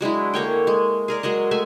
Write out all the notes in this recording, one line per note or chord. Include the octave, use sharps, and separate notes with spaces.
F#3 G#3 D4 E4
D3 A#3 C#5 G5
G#3
G#4 A#4 D5
F#3 G#3 G#4 D#5
G#3 A3 E5 G#5